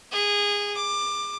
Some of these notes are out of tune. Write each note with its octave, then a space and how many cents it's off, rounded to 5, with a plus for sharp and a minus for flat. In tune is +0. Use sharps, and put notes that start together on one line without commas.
G#4 -20
D6 +20